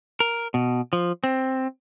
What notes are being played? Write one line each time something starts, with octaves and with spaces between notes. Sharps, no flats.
A#4
B2
F3
C4